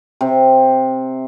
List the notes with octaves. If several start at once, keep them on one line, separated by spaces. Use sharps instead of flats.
C3